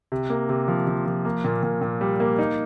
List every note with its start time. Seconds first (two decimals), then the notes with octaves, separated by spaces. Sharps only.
0.12 C3
0.30 A#3
0.49 C3
0.68 F3
0.87 F3
1.06 F3
1.25 A#3
1.45 A#2
1.63 A#2
1.81 A#2
2.01 G3
2.20 A#3
2.39 D#4